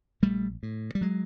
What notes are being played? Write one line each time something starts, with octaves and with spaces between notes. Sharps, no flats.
A#1 G3 A3
A2
G3
F#3 G#3